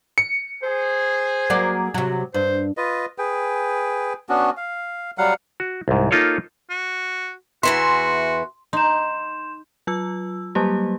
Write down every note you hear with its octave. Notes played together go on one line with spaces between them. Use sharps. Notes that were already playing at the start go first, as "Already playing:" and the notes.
C#7
G#4 C5
F#3 A#3 D5
C3 F#3
G2 C5
F4 B4 D#5
G#4 B4 G5
B3 C#4 D4 F#4
F5
F#3 G3 F5 F#5
F#4
C2 G#2
A#3 D#4 F4 A4 C#5
F#4
E2 E3 F#4 E5 C6
D#4 C6 G6 E7
F#3 F4 E6
F#3 G3 A#3 G4